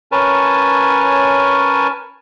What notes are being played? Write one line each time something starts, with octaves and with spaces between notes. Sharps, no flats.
C#4 A#4 B4 C#5 G#5 A5